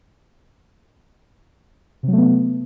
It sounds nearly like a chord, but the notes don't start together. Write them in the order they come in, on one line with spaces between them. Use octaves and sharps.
C3 F#3 A3 B3